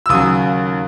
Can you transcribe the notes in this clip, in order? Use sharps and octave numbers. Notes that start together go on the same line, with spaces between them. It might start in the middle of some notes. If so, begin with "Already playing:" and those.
E6
D#2 C#3 F#3 D#6